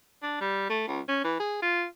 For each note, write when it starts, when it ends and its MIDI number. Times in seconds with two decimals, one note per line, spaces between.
0.23 0.37 62
0.41 0.69 55
0.69 0.83 57
0.87 1.00 37
1.08 1.19 61
1.24 1.36 52
1.40 1.58 68
1.62 1.85 65